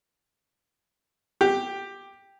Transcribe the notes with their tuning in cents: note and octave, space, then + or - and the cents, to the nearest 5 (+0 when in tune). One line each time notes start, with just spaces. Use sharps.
G4 +5